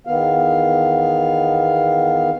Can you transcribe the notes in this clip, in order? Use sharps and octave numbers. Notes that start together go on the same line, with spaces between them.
E2 D#3 B3 F5